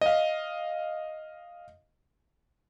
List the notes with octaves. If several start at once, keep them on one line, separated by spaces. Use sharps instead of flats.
D#5 F5